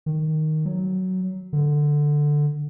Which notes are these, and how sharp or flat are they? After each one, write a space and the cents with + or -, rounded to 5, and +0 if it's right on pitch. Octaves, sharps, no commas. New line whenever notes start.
D#3 +0
F#3 +10
D3 +5